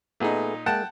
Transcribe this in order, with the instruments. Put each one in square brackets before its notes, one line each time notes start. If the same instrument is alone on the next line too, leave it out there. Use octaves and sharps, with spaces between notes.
[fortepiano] A#2 D#4 [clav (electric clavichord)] A3 B3 G#4
[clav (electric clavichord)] G#3 A#3 [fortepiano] F#5 G5 A5